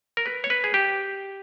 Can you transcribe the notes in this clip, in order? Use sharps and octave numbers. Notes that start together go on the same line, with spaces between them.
A#4
B4
C#5
B4
G#4
G4